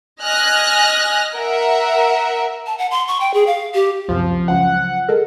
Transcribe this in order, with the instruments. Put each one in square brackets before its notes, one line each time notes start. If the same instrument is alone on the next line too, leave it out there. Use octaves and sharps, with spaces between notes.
[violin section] D#5 G#5 F6 F#6 A#6
A#4 E5 F#5
[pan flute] A5
F#5
C6
C#6
G5
G#4
F5
G4
[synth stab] C#2 F#2 C3 [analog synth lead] F3
[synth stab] C#2 F#2 F3 [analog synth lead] F#5
[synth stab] G#3 A4 A#4